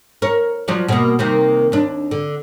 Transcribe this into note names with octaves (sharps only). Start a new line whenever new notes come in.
A#4 C#5
F3 F#3 D5
B2 A#3
C3 D#3 A#3
D#2 D4
D3